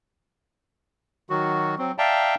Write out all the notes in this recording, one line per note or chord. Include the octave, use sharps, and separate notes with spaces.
D#3 F#3 F#4
F#3 C4
D5 E5 F5 G5 A5 A#5